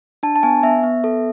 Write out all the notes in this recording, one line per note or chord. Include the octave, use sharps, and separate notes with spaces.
D4 A5
A5
B3 G#5
B3 E5
B3
A4